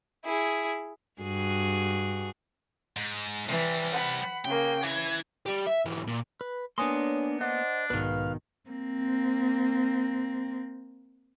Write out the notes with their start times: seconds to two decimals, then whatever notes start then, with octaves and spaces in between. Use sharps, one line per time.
0.25 E4 G#4
1.22 G2 F#4 G#4
2.96 G#2
3.49 C3 E3 G3
3.92 F#5 B5
4.45 C#3 A#3 G5
4.84 E3 G#6
5.46 G3 G4
5.67 E5
5.85 G#2 E3
6.07 A#2
6.41 B4
6.78 A#3 B3 D4 C#5 G#5 C6 D#6
7.41 D4 C5 D#5 F#5
7.90 B1 G#2 B2 D#3 B4 F5
8.70 A#3 C4